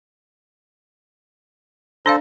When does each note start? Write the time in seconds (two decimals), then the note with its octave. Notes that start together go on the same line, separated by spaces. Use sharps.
2.06 D4 A4 C5 D5 F5